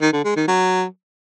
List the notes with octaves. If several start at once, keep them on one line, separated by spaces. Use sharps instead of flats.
D#3
D3
G#3
D#3
F#3